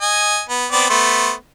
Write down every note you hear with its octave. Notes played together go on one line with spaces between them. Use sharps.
D#5 G#5
B3
B3 C4 D5
A3 B3 C5